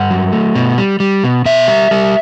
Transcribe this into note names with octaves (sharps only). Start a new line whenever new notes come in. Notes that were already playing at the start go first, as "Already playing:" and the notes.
Already playing: G2 F#5
F#3
A3
B2
G3
G3
B2
B2 E5
G3
G3